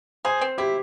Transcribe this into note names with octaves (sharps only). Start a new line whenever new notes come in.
G#4 C5
C4
E4 G4